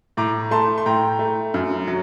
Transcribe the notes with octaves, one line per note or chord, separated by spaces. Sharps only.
A2 A#5 D6
A3 A5 C6
C6
A2 G5 A#5
A3
F#2
F#3